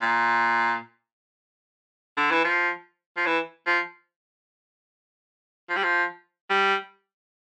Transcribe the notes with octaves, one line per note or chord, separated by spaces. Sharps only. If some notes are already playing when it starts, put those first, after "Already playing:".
A#2
D3
E3
F3
F3
E3
F3
F3
G3
F3
G3